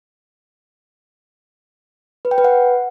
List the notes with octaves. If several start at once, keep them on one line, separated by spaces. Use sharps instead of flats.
B4
G5
B4
F#5